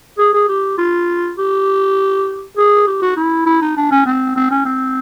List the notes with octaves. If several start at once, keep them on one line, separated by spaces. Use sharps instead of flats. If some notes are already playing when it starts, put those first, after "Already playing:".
G#4
G#4
G4
F4
G4
G#4
G4
F#4
E4
E4
D#4
D4
C#4
C4
C4
C#4
C4